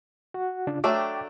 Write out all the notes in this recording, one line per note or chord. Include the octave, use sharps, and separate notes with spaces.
F#4 F#5
C#3 D4 F4
F#3 A3 D4 G5 D6